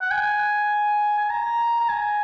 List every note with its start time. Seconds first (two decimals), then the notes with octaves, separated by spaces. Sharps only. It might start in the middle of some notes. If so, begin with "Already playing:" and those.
0.02 F#5
0.11 G#5
1.18 G#5
1.30 A#5
1.80 A#5
1.89 G#5